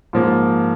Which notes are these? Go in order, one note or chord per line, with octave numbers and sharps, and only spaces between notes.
G#2 F3 A#3